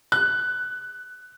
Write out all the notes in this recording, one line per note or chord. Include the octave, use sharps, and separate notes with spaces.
F#6